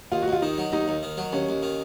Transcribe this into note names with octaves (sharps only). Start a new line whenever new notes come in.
D#2 F4
F#4
D#2 F4
D#3 D#4
F#3
D#2 D#4
D#2
D#3
F#3
D#2 C#4
D#2
D#3